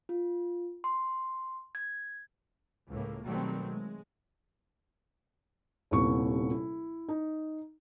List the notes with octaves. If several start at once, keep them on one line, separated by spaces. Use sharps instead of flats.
F4
C6
G#6
C#2 A2 A#3
B2 D#3 F#3 G3 A3 C4
G#3
D#1 D#2 C3 B3 E4 C#6
E4
D#4